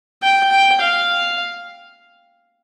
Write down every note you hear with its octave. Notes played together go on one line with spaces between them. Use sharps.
G5
G5
F5